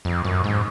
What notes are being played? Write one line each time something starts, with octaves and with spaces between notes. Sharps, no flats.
F2
F#2
G#2